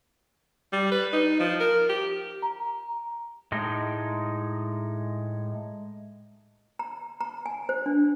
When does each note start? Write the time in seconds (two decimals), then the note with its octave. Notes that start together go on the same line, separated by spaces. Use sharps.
0.73 G3
0.92 B4
1.13 D#4
1.40 F3
1.60 A#4
1.89 G4
2.42 A#5
3.52 A2 G#3 D#4
6.79 A#5
7.21 A#5
7.46 G#5
7.69 C5
7.86 D4